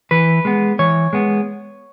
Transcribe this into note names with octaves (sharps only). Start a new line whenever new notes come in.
E3 B4
G#3 B3
E3 C#5
G#3 B3